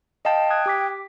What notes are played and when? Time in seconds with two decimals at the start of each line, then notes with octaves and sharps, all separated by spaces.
0.25 D#5 F5 G5 A5
0.50 D#6 F#6 G#6
0.66 G4 D6 B6